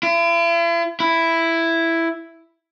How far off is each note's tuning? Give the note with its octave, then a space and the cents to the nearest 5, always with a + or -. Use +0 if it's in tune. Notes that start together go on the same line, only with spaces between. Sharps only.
E4 +45
E4 +5